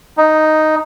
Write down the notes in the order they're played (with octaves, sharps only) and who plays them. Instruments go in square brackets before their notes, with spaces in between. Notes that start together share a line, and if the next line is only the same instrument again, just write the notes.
[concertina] D#4